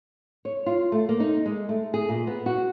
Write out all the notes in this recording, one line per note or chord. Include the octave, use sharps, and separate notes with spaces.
C#5
F4
A3
A#3
D#4
G#3
A3
G#4
A#2
B3
F#4